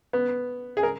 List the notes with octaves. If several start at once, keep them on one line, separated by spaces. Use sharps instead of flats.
B3
G#4
A#4